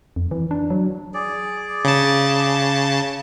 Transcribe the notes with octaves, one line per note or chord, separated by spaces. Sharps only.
F2
E3
D4
F#3
G#4 D5
C#3 A5